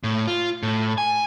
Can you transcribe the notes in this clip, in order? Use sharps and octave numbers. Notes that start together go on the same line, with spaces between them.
A2
F4
A2
G#5